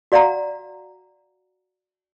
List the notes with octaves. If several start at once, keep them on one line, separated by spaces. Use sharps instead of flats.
F#4 D5 F5 F#5 A#5